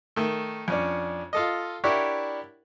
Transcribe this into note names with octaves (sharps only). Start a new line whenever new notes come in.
D#3 A3
F2 C#4 D4
F4 A4 D#5
D4 E4 G4 A#4 C#5 F#5